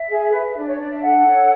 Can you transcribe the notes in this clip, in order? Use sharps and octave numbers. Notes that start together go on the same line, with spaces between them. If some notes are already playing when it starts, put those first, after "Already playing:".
Already playing: E5
G#4
B4
D4 D5
C#5
D4 D5
E5
A4 F#5
C#5